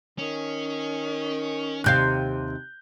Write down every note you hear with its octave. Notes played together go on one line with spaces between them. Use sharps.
D#3 C#4
D#2 C3 F5 F#6 G6